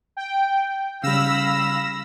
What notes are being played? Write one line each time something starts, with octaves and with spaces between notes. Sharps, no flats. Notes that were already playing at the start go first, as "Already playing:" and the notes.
G5
C#3 G3 F5 B5 E6 A#6